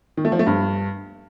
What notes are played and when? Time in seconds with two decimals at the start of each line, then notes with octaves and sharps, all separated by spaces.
0.17 D#3
0.25 A3
0.32 F3
0.39 A3
0.47 G2